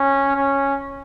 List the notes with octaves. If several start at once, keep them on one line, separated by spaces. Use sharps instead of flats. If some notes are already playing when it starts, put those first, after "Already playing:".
Already playing: C#4
C#4